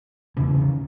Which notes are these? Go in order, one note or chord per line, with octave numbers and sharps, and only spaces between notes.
E2 C#3 E3
D#3